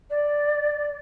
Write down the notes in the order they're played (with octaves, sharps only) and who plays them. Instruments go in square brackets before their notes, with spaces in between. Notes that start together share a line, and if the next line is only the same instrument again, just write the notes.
[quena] D5